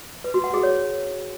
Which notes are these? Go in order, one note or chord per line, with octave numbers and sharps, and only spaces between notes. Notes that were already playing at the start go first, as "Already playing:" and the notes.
B4
F#4
F#5
G#4
C#5